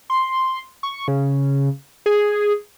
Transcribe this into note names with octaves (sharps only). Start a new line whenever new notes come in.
C6
C#6
C#3
G#4